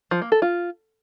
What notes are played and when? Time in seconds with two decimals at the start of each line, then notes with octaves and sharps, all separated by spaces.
0.11 F3
0.22 A#3
0.32 A4
0.42 F4